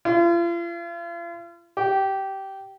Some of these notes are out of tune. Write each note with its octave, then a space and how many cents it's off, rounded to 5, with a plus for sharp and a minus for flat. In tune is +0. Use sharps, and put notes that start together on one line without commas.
F4 -40
G4 -15